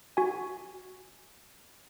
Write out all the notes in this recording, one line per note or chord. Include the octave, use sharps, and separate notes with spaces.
F#4 G#5